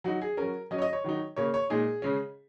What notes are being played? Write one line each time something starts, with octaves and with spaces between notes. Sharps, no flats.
F#3 D#4 F#4
G#4
F#3 C#4 A#4
F#3 C#4 D#5
C#5
D#5
C#5
D#3 F#3 D#4
C#3 A#3 C#4 C#5
C#5
A#2 G#3 D#4 G#4
C#3 G#3 C#4